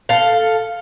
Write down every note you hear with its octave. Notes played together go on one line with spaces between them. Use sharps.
A4 F5